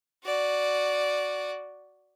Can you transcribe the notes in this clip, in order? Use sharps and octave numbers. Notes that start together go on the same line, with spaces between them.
F#4 D5